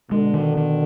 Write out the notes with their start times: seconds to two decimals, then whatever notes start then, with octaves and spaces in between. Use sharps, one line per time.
0.11 B2 D3 G#3
0.34 D#3
0.57 D#3